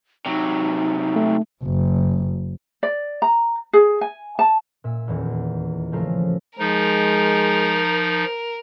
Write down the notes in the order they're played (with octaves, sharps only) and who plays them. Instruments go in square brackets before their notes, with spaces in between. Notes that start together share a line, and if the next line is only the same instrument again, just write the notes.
[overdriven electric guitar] C3 F#3 [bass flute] D#4
[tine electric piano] A3
[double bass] F#1
[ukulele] D5
A#5
G#4
G#5
A5
[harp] A#2 E5
D#1 E2
A1 C#3 F3 A3 A#4 F5
[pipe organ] F3 D#4 [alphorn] G#3 [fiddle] A#4